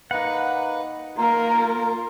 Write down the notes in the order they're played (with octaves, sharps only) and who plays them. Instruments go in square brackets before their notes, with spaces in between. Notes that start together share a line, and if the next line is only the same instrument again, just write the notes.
[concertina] A#3 B4 [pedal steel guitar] D#4 F#5
[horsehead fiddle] A#3 A#4 [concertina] F4 [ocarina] A#5